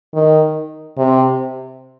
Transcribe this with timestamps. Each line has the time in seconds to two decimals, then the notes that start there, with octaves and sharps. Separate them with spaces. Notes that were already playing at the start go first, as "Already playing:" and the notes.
0.14 D#3
0.98 C3